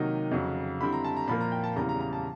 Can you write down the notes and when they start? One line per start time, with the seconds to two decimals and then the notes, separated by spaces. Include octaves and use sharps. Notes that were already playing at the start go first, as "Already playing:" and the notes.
Already playing: C3 D#3 F#3 A#3 D#4
0.31 F2 C#3 F#3
0.81 D3 G3 C4 E4 B5
0.93 A#5
1.04 A5
1.17 A#5
1.28 A#2 F3 A#3 B5
1.41 A#5
1.52 G5
1.64 A5
1.76 E2 C#3 E3 G3 A#5
1.89 A#5
2.00 A#5
2.13 A5